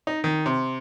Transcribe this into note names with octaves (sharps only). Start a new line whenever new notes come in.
D#4
D#3
C3